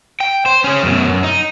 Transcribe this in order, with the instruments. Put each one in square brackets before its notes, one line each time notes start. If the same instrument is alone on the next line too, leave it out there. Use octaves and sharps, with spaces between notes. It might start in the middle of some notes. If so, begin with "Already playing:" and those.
[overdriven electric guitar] G5
C5
C#4 G#4
F#2 B2
F#2
D#4